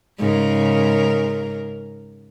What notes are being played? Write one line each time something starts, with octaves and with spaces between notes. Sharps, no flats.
G#2 C#3 A#4